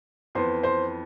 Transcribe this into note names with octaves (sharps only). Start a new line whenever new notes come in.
F2 E3 B3 C5 C6
C5 C6